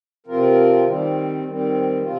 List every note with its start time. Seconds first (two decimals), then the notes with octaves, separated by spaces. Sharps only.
0.26 C3 F3 C4 F4 A#4
0.85 D#3 G3 C4
1.44 D#3 G3 C4
2.02 C3 F3 C4 F4